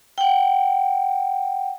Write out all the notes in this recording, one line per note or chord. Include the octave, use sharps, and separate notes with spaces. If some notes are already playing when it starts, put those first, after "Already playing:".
F#5 G5